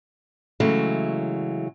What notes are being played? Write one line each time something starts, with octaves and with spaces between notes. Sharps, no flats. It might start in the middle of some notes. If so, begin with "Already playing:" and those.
C#3 E3 F#3 G#3 A3